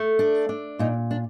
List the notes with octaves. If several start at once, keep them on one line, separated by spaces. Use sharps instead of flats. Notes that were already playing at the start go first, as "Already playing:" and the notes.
Already playing: A3
D4
D4
A#2 D#4
D4